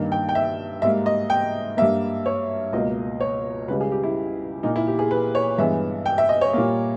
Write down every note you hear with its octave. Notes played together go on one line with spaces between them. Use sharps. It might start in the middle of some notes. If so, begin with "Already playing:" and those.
Already playing: G2 D#3 A#3
G5
G5
E5
G#2 G3 A#3 E5
D#5
G5
G2 G3 A#3 E5
C#5
C#2 B2 A#3 D#5
C#5
C#2 C#3 G3 B4
G#4
G4
E4
A#2 A#3 D#4
E4
G4
G#4
B4
C#5
G2 E3 G#3 B3 E5
G5
E5
D#5
C#5
A#2 G3 A#3